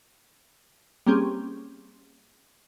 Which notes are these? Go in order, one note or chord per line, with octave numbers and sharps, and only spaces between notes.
G3 A#3 C4 C#4 G4 G#4